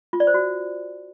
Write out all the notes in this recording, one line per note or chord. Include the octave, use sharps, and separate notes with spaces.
F4
D5
C5
F#4